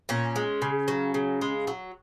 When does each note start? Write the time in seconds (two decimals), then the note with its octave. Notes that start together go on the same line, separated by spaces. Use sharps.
0.09 A#2 C#4
0.36 G#3
0.62 C#3
0.88 F#3
1.14 C#3
1.41 G#3
1.67 F#3